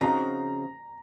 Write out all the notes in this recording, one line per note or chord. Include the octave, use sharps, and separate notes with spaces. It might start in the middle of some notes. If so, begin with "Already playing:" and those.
C#3 F3 C4 D#4 F#4 A#5